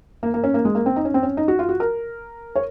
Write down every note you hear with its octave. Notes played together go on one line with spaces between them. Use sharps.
A#3
A#3
C#4
A#3
G#3
A#3
C4
D#4
C#4
C4
C#4
D#4
F#4
F4
F#4
A#4
C#5